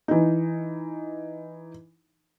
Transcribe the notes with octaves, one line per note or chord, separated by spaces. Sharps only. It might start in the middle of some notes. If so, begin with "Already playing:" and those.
E3 D#4